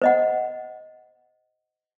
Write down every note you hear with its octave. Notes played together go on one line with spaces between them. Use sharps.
C5 D#5 F#5